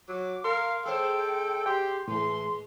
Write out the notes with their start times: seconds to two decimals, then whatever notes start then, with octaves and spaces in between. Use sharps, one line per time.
0.09 F#3 D6
0.44 A#4 F5 C6
0.86 G#3 A4 C5 G5
1.66 G4 G5 C6
2.08 A2 E3 G#3 C6